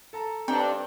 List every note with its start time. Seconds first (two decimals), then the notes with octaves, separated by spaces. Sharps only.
0.13 A4 A5 A#5
0.48 G2 C4 D4 D#4 G5